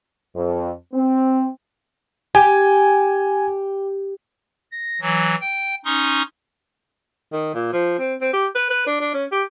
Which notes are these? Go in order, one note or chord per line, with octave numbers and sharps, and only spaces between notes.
F2
C4
G4 G#5
A#6
E3 F#3
G5
C#4 D#4 C6 C#6 D#6
D#3
A#2
F3
C4
C4
G4
B4
B4
D4
D4
C#4
G4